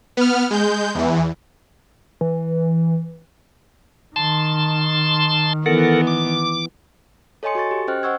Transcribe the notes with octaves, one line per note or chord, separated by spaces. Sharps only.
B3 F6
G#3 G6
E2 E3
E3
D#3 A5 C6
E3 B3 A4 A#4 F#5
D6
A4 C#5 D#5 G#5 C6 C#7
F#4 A4 C#6 A6
G4
C#4 C5 D#5 G5 F6 F#6
C5 D#5 F#5 C#6 E6 G#6